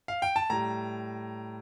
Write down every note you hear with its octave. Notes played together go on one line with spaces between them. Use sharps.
F5
G5
A5
A2 G3 A#5